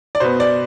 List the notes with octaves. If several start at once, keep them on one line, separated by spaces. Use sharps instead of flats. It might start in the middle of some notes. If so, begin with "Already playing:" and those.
D5
B2 B3 C5
D5